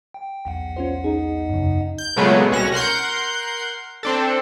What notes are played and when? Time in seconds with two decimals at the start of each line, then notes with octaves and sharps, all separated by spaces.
0.14 G5
0.45 B1 E2 F#5
0.76 C#4 F4 C5
1.04 D#4 G#4
1.49 F#2 C#3
1.98 G6
2.16 A#2 C#3 F#3 G#3 A3 B3
2.51 C2 C#4 F#4 A#6
2.72 A#4 F#5 C6 G6
4.03 C4 D4 A4